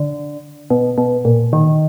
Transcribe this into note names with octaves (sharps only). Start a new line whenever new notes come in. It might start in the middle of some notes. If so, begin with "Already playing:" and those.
Already playing: D3
B2
B2
A#2
D#3